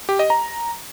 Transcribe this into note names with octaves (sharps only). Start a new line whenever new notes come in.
G4
D#5
A#5